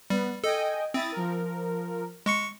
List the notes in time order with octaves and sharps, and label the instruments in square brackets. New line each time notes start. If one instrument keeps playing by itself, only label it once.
[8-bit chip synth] G3 [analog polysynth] B3
[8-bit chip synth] A4 [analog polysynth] D#5 G5 G#5
[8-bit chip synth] C4 [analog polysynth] E4 D#6 A6
[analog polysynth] F3 A#4
[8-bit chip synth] G#3 C#6 C#7